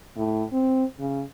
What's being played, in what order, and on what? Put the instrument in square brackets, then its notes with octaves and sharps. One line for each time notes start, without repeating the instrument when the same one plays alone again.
[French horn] A2
C4
C#3